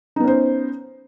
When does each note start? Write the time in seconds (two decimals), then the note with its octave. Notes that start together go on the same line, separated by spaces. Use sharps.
0.16 D#4
0.20 B3
0.24 C#4
0.27 C5